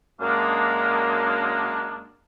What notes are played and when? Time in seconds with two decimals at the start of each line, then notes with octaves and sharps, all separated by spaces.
0.21 F#2 G#3 A#3 D4